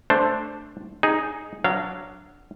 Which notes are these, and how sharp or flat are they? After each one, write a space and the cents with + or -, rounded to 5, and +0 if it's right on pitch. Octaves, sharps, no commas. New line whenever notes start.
A3 +0 D4 +0 C5 +0
D#4 +0 G#4 +0
F#3 +0 D4 +0 F5 -20